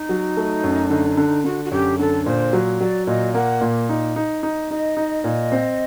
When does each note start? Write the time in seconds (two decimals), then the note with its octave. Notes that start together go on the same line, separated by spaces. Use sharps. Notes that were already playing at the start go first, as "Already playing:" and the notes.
Already playing: D#4
0.09 F#3
0.37 A3
0.63 F#2
0.90 D3
1.17 D3
1.44 D3 F#4
1.65 F#4
1.71 F#2 G4
1.99 D3 A4
2.26 A#2 C5
2.53 F#3
2.80 F#3 D5
3.07 A#2 D#5
3.34 A#3 F#5
3.61 A#2
3.89 D#4
4.16 D#4
4.43 D#4
4.70 D#4 D#5
4.97 D#4
5.24 A#2
5.52 C4